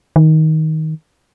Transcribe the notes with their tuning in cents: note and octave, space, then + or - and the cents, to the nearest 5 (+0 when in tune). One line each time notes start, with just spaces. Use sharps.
D#3 +15